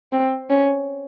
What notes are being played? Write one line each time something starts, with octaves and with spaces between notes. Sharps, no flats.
C4
C#4